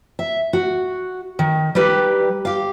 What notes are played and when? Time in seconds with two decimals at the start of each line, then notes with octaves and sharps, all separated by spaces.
0.19 E5
0.53 F#4
1.39 D#3
1.75 G3 D#4 G4 B4
2.45 G4 F5